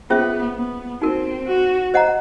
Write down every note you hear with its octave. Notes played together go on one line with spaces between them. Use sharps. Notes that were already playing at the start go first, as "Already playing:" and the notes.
B3 C#4 F4 G#4 C5 E5
B3
C4 D#4 F#4 A#4
F#4
C5 D#5 F#5 A#5